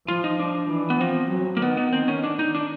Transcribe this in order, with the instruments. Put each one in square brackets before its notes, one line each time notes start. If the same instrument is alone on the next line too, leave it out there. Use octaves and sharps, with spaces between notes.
[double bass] F3 [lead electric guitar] F4
[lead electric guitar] D#4
D4
[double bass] E3
[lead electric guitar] B3
[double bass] F3 [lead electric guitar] C4
[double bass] F#3
[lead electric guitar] A#3
[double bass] D#3 [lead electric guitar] B3
[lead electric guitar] B3
C4
C#4
D4
D#4
D4